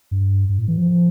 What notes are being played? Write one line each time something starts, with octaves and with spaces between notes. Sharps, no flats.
G2
G2
A2
E3
F3